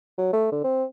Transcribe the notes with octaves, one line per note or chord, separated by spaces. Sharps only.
F#3
A3
D3
C4